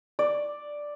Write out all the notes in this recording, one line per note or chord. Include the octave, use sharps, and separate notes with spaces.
D5